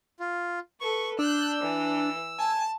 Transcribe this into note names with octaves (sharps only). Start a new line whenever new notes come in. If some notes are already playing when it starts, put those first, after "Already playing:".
F4
A4 B4 C#6
D4 E6 F#6 G6
E3
G#5 A5